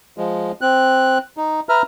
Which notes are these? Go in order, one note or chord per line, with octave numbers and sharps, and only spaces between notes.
F3 G#3
C4 F#6
D#4
B4 E5 A#5 F6